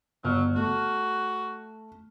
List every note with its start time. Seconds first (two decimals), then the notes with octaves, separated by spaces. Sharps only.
0.24 G1 F#3 F6
0.56 A3 F#4